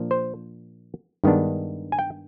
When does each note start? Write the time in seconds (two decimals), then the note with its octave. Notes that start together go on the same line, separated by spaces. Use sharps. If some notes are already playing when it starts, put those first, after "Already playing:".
Already playing: A#2 F3 A#3 D4
0.11 C5
1.24 G2 D#3 G#3 B3 D4
1.92 G#5
1.99 G5